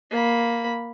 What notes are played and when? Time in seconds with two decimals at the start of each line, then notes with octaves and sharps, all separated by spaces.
0.11 A#3 B5